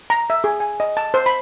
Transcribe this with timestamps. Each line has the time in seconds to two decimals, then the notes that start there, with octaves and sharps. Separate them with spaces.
0.10 A#5
0.30 E5
0.44 G#4
0.60 G#5
0.80 D#5
0.97 A5
1.14 C5
1.26 B5